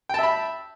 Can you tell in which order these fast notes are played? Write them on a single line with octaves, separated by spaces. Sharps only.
G5 A5 E5 B5